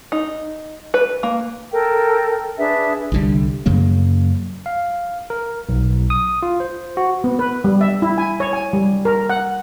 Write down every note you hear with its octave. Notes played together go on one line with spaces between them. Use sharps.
D#4
B4
A#3
A4 A#4 G5
D4 G#4 B4 E5
C2 D3 G3
F#2 C#3 F#3 A#3
F5
A#4
B1
D#6
F4
C5
F#4
B3
B4
G3
E5
E4
G#5
C#5
G#5
G3
A#4
F#5